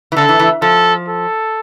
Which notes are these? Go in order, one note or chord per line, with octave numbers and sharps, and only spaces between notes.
E3
D3 A4
E3
E3
F3 A4
A4